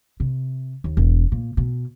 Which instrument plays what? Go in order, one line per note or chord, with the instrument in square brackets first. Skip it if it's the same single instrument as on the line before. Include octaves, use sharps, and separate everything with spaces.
[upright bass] C3
D#2
E1
A#2
B2